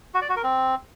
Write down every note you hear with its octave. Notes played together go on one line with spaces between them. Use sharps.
F#4
D5
F#4
A#4
C4